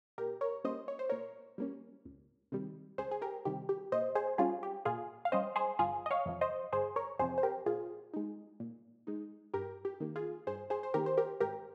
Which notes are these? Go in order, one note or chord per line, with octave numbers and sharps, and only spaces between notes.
A#2 G4 A#4
A#4 C#5
G3 A#3 C#4 C5 D#5
C#5
C5
A#2 A#4 C#5
G3 A#3 C#4
C#2
C3 D#3 G3
C#2 G#4 C5
G#4
G4 A#4
C3 D#3 G3 G4
G4
A#2 C5 D#5
G#4 C5
G3 C#4 F4 G#4
G4
A#2 F4 G#4
F5
G3 C#4 C5 D#5
G#4 C5
G1 F4 G#4
D#5
C#5 F5
F2 C3 F3
C5 D#5
G1 G#4 C5
A#4 C#5
F2 C3 F3 G#4 C5
C5
G4 A#4
A#2 F4 G#4
G#3 D#4
A#2
G#3 D#4
G2 G4 A#4
G4
D#3 A#3
F4 G#4
G2 G#4 C5
G#4 C5
C5
D#3 A#3 G4 A#4
C5
G4 A#4
G#1 G4 A#4